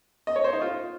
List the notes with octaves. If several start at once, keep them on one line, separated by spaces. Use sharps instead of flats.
D#5
C#5
C5
D#4
F4